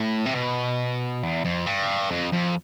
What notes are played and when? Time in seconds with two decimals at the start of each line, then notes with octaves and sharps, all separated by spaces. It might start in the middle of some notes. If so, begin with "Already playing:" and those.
Already playing: A2
0.26 C3
0.35 B2
1.23 E2
1.45 F2
1.66 G2
2.11 F2
2.32 F2